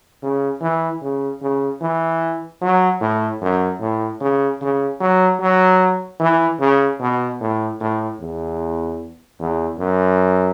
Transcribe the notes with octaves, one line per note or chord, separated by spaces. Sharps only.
C#3
E3
C#3
C#3
E3
F#3
A2
F#2
A2
C#3
C#3
F#3
F#3
E3
C#3
B2
A2
A2
E2
E2
F#2